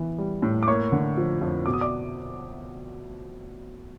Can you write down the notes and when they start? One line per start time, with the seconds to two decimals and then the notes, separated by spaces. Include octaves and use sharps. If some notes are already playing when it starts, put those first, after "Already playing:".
Already playing: E3 B3
0.18 G3
0.42 A2
0.63 D6
0.68 A#3 C#5 C#6
0.92 D3
1.17 F3
1.41 F2
1.66 B2 D6
1.73 D#6
1.81 D5 D6